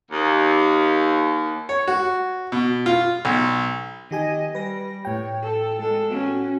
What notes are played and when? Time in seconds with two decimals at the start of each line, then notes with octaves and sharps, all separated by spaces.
0.11 D#2
1.69 C#5
1.87 F#4
2.52 B2
2.86 F4
3.25 B1
4.11 D#3 G4 D#5 G#5
4.55 G3 B4 A#6
5.05 A2 C#5 G5
5.43 A4
5.79 G#3 A4
6.10 C#4 F#4